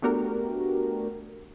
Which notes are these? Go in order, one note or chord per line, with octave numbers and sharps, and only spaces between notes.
A3 B3 D4 F#4 G4 A#4